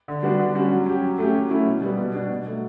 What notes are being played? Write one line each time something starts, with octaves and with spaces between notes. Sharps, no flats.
D3
G3 B3 D4 F#4
D3
G3 C#4 F#4
F#3
C#4 G4
F#3
A3 C#4 G4
F#3
A3 C#4 E4
B2
G3 B3
B2
G3 D4 F#4
B2
F#3 A3